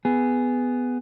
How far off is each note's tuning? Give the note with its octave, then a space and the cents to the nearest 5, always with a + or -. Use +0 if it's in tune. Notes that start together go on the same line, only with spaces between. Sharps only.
B3 +10 G#4 +0